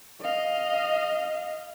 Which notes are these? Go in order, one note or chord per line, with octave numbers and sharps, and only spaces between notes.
D#5 F5